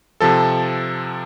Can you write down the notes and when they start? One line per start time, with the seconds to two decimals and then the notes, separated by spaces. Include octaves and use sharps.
0.20 C3 F3 A4 A5